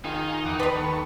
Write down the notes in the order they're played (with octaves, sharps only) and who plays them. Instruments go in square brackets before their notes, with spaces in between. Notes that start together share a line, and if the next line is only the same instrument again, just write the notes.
[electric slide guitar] D#3 [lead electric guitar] D#4 [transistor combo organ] F4 G#4
[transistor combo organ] E2 F#5 D6
[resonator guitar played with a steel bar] B3 B4 [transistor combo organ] D5 A5 C6
[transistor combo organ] D#2 A4 C#6